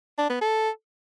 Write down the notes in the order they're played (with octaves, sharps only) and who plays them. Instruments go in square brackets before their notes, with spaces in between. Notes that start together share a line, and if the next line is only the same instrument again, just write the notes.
[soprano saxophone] D4
B3
A4